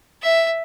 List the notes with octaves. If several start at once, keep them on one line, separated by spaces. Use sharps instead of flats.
E5